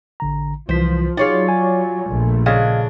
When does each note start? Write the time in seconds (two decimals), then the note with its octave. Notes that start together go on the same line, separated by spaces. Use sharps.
0.20 A1 D3 A#5
0.69 C2 E3 F3 C5 B6
1.17 F#3 D#4 F4 G#4 C#5 D5
1.48 G#5
2.10 A#1 A3
2.46 C#3 D4 D#5 F5 G#6